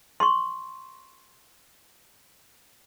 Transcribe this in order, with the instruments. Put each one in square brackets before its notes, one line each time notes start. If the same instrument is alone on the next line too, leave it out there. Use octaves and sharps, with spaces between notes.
[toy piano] C6 C#6